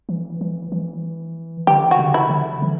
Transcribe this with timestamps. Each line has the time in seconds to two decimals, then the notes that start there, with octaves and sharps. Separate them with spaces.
0.09 E3
0.41 E3
0.72 E3
1.67 D3 G4
1.91 F#4
1.99 C#3
2.14 E4
2.30 D3
2.62 E3